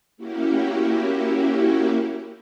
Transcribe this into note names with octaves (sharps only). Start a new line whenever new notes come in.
A#3 C#4 E4 F#4 G4